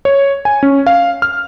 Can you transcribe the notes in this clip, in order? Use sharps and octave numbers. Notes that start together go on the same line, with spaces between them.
C#5
G#5
C#4
F5
F6